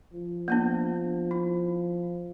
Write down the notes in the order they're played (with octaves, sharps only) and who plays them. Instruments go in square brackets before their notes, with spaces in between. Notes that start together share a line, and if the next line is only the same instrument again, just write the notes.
[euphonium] F3
[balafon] A#3 B3 D4
E4